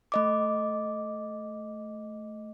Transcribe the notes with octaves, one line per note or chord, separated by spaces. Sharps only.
A3 D#5 D6